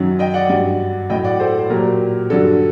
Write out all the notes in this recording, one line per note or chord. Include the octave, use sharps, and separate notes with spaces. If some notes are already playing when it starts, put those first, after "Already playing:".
Already playing: F#2 D#3 F#3
D#5 G5
D5 F#5
G2 F#3
A2 F#3 D#5 G5
D5 F#5
A4 C5
C5
A#2 F#3 G4 A#4
G2 D3 F#3 A4